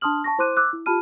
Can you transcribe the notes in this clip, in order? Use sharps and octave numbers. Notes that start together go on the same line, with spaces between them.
D4 A5 C6 D#6 F6 F#7
A5 C#6 A#6
E4 C5 C6 D6 F#6 D#7
D6 E6 F#6
E4
F4 G4 A5 B5 F6 D#7